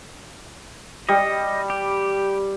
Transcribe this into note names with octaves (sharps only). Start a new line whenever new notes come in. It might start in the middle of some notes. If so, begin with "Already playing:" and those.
G3 D#5
G4